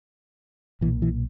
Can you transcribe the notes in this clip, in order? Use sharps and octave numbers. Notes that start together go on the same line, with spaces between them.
B1 A#2 E3
E3